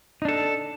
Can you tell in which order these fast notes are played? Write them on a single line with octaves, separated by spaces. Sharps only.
D#4 D4 A4